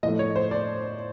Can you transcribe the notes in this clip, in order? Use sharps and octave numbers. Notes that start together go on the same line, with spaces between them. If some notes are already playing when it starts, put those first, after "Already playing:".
A2 F3 A3 D#5
C#5
C5
D5